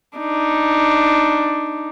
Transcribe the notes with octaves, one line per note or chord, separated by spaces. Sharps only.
D4 D#4